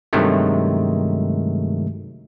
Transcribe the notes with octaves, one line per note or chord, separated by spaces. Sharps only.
G2 C3 D#3 F#3 G#3 A3